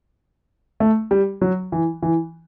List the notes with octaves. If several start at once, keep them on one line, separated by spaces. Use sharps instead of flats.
A3
G3
F#3
E3
E3